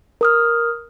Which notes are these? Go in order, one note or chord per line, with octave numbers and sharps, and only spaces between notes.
A#4 D#6 F6